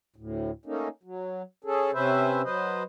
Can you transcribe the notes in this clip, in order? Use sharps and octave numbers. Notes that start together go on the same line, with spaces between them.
D2 A2
A3 A#3 C#4 D#4
F#3
C#4 G#4 A4
C3 C#4 B4 C5 E5
F#3 B4 C5 D#5